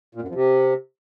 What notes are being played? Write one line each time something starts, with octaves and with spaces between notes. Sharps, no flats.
A#2
F#2
F2
C3